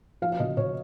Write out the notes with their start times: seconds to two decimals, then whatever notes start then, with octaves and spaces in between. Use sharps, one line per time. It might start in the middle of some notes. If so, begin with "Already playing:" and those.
0.22 F3 F5
0.32 F5
0.40 C#3 D#5
0.57 C#3 C#5